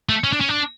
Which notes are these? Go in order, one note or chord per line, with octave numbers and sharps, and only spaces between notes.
A3
C#4
D4
C#4
D4